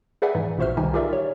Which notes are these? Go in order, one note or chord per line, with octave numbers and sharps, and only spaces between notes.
G#4 B4 D5 E5 F#5 G#5
G#2 E3 D#4
A1 A#2 F#4 C5 E5 F6
C2 D#3 D#4 G4 G#5
F4 G4 G#4 A#4 D5 E5
C#5